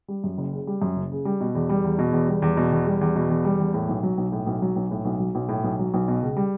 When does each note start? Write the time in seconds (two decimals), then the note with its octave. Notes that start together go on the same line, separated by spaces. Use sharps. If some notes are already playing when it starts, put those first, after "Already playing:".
0.08 G3
0.24 F#2
0.38 F#1
0.53 C#3
0.67 G3
0.82 F#2
0.96 F#1
1.11 C#3
1.25 G3
1.41 B2
1.55 E2
1.69 G3
1.84 E2
1.99 B2
2.13 E2
2.28 G3
2.42 E2
2.57 B2
2.72 E2
2.87 G3
3.01 E2
3.16 B2
3.30 E2
3.45 G3
3.60 E2
3.74 A2
3.89 B1
4.03 F#3
4.18 B1
4.32 A2
4.47 B1
4.62 F#3
4.76 B1
4.91 A2
5.05 B1
5.20 F#3
5.35 B1
5.49 A2
5.64 B1
5.79 F#3
5.94 B1
6.08 B2
6.22 C#2
6.36 G3